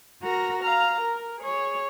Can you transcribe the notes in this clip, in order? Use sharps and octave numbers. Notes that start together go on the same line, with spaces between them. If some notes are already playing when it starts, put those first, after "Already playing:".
F#4 A#4 A#5 A#6
F5 A#5
A#4
G#4 C#5